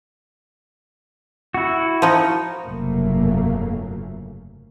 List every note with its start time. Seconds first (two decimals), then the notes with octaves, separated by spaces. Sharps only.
1.54 E4 F#4
2.02 F3 D#4
2.66 F1 G2 C#3 F#3 A3 A#3